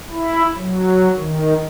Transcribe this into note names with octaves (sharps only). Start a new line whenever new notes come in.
E4
F#3
D#3